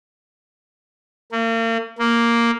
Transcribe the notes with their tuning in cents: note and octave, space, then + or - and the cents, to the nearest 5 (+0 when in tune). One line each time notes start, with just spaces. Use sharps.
A#3 -40
A#3 +0